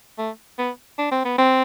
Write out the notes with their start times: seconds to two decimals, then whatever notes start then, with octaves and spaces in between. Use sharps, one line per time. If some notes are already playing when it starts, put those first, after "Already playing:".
0.18 A3
0.59 B3
0.98 D4
1.11 C4
1.25 B3
1.38 C4